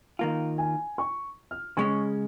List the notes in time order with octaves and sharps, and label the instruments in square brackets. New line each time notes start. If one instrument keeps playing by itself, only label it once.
[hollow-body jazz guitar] D#3 A#3 F4
[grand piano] G#5
C#6
F6
[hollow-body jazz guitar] C#3 G#3 C#4 [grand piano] C#6